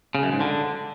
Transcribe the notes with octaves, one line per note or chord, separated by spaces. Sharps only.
C#3
F#2
G#2
D3